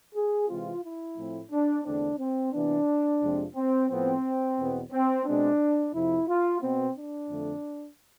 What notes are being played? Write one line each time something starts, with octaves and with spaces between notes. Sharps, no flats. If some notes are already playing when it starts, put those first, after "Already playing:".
G#4
C3 E3 G#3 C4 F4
E4
A2 F3 A3 C4
D4
E2 D3 A3 C4 D4
C4
C3 E3 B3 D4
F2 C3 F3 G#3 C4
C4
A2 F3 B3 C4
E2 B2 B3
C4
B2 G#3 C4 D4
F2 C3 F3 E4
F4
B2 B3 C4
D4
F2 D3 A3